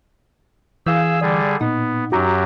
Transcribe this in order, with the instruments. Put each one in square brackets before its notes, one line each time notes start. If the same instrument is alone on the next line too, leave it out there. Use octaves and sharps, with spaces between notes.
[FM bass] E3 [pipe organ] G#4 E6 [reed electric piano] F5 G6
[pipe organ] D3 G3 G#4 [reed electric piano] D5
[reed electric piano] A#2 [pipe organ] B3 [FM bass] D#4
[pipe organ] F#2 F#3 G4 [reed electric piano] F#4 A#5